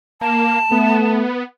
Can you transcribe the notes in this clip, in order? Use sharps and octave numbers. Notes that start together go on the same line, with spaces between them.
A#3 A5
A3 B3